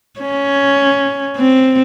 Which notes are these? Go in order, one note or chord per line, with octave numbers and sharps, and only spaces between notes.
C#4
C4